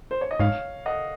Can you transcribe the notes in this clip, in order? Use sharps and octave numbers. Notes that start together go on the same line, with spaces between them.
C5
C#5
D#5
G#2 C#5 F5
D#5 F#5